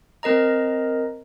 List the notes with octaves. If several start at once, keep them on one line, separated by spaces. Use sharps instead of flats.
C4 A#4 D#5 A#5